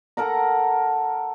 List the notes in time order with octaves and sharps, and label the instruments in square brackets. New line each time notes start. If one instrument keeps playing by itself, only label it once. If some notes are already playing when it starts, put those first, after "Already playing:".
[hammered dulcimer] A4 A#4 F#5 A#5